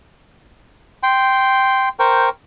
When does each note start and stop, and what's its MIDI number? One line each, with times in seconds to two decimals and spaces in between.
1.03 1.89 79
1.03 1.89 84
2.00 2.29 70
2.00 2.29 72
2.00 2.29 79
2.00 2.29 85